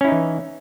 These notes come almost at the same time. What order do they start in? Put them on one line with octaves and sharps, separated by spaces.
C#4 E4 D#4 E3